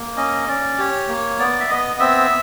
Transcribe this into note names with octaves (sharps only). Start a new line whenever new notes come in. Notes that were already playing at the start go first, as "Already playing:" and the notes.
Already playing: A#3
C#4 D#5
C#4 D5
G4 C#5
A#3
B3 D5
E5
B3 D#5
C4 E5